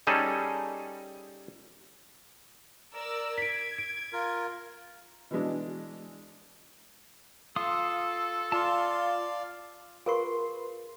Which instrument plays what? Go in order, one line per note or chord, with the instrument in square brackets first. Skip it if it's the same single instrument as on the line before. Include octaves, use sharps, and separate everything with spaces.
[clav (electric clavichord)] G3 C#4 D#4 G#4 A4
[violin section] A#4 D5 E6
[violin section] G#6 [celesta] B6 D7
[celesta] D7
[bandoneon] F4 A#4
[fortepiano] B2 E3 G#3 D4
[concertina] F4 [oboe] A4 [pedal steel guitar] F5 C6 D#6
[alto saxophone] F4 [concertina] D5 F5 [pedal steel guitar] A5 C6
[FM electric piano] F4 B4 C6 [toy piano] G#4 A#4 C#6